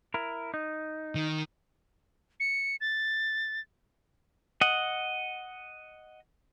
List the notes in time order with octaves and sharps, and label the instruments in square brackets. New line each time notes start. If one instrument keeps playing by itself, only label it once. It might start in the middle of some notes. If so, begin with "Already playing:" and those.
[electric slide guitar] E4 A#4
D#4
[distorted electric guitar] D#3
[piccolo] C#7
A6
[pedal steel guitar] D#5 F#5